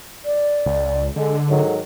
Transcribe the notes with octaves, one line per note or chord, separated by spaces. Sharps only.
D5
C#2
D3 G#3 A4
G#2 D#3 F#3 A4